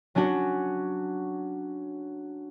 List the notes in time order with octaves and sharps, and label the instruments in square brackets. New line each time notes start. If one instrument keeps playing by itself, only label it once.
[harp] F#3 C#4 D4 F#4